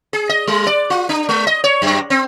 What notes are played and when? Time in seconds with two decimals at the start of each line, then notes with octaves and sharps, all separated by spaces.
0.13 G#4
0.29 D#5
0.47 G3
0.67 D5
0.90 F4
1.09 D4
1.29 G#3
1.47 D#5
1.64 C#5
1.82 F#2
2.10 C4